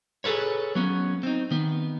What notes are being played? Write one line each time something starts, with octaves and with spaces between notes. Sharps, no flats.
G#4 A4 B4 C#5
F#3 B3 C#4
C4 D#4
D#3 B3